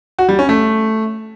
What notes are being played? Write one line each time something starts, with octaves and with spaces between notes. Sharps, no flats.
F#4
G3
C#4
A3